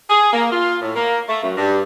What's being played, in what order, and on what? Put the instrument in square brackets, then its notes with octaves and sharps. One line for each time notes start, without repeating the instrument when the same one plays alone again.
[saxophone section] G#4
A#3
F4
A2
A#3
A3
F#2
G2